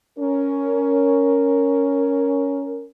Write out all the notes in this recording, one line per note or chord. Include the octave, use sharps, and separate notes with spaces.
C#4 A#4